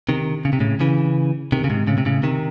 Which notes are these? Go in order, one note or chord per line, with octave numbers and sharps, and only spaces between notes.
C3 D#3
C#3
C3
A2 C#3
C#3 E3
C3 D#3
C#3
G#2 C3
A2 C#3
C3
A2 C#3
C3 D#3